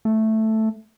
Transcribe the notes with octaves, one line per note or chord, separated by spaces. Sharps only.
A3